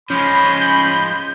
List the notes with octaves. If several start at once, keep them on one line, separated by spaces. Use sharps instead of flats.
F3 G#3 C#4 B5 G6